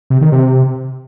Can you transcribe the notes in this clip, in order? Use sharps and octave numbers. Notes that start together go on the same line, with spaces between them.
C3
D#3
C3